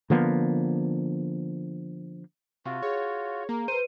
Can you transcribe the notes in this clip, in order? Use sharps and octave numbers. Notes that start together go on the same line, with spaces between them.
D3 F3 A#3 B3
C3 F4 F#4
G#4 C#5
A#3 A#4
B4 C5 D#7